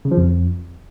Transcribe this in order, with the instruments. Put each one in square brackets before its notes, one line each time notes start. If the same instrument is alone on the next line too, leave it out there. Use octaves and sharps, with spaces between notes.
[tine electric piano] C#3
F3
F2